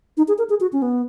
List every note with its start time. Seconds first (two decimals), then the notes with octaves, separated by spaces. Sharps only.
0.17 D#4
0.28 G#4
0.38 A#4
0.50 G#4
0.61 F#4
0.73 C#4
0.82 B3